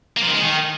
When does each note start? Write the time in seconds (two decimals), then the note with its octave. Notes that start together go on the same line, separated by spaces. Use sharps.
0.17 A#3
0.23 F3
0.28 D#3
0.34 G#3
0.39 D#3